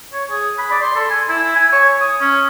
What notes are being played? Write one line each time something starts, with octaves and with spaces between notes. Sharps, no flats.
C#5
G#4
B5
D5
C6
A4
G#5
E4
G#5
C#5
D#6
C#4